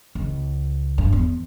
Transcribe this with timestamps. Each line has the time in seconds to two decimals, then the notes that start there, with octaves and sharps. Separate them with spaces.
0.15 C#2
0.98 G2
1.13 E2